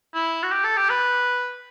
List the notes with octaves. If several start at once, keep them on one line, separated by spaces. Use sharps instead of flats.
E4
F#4
G4
A4
G4
B4